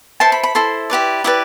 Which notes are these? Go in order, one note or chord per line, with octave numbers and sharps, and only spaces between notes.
E4 A4 C5 A5
B5
B5
E4 A4 C5 C6
E4 G4 B4 D5
E4 G4 B4 D5 D6